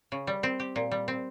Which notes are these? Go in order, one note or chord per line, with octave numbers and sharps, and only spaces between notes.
C#3
G3
C4
G4
A#2
G3
C4